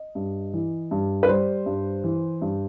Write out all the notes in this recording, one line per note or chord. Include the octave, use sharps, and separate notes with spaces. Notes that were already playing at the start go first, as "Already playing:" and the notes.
Already playing: D#5
G2
E3
G2
B4
G3 C5
G2
E3
G2